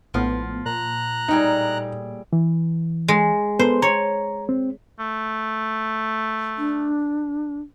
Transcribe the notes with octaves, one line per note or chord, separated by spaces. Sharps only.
A#1 A2 F3 B3 F4
A#2 A#5 F#6
A2 G3 D#4 G#4
E3
G#3
B3 A4 B4 C5
C#5 A#5
C4
A3
D4